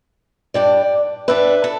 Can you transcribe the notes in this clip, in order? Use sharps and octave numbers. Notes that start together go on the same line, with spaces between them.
G2 G3 D4 D5 G5
G2 G3 D4 B4 E5
A4